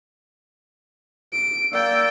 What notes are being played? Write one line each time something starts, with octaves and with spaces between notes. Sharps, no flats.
D7
A#3 D5 G5 E6